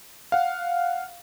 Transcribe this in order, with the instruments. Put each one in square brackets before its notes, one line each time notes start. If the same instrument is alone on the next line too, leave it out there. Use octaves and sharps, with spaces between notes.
[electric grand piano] F5 F#5